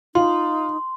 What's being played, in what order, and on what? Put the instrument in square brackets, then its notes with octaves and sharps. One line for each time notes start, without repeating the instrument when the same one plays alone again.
[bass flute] D#4 [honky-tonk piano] F4 [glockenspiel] C6